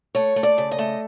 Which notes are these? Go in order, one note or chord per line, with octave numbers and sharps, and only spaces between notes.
A3 C#5
A3
D5
C#3
D#5
A3